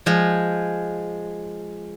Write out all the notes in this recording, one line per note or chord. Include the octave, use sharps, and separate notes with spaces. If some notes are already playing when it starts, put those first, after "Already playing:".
F3 G#3